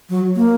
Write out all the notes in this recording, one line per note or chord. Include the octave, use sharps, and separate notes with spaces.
F#3
A#3